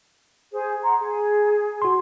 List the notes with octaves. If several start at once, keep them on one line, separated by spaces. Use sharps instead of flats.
G#4 C5
F#5 A#5 C6
G#4
F#4 C6